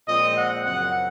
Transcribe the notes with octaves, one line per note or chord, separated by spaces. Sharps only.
A#2 F3 G#3 C4 D#5
F#5
F#2 C#3 F3 C4 F#5